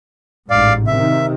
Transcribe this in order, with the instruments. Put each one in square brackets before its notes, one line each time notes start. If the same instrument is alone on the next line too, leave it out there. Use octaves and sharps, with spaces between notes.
[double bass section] A1 G#2 [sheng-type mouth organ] D5 F5
[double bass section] C3 D#3 [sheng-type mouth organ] E5